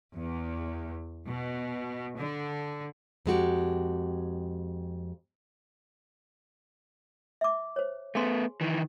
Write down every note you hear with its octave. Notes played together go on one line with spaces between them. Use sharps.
E2
B2
D3
F2 G#3 F#4 G4
E5 D6
C5 C#5
A3 B3 G#4 G#5 C6
D#3 E3